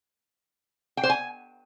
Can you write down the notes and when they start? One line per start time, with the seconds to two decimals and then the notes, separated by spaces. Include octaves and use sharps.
0.97 G5
1.03 C5
1.10 G#5